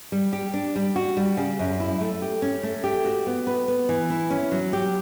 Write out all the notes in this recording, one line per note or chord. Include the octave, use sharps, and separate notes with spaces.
G3
G4
D4
G3
F#4
G3
C#3
F#2
E4
A3
G4
C#4
A3
G4
F#4
B3
B4
B3
E3
E4
C#4
F#3
G4